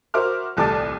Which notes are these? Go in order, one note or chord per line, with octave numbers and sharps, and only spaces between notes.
F#4 A#4 C5 E5 D6 F6
D#1 C2 A3 A4 D6 A6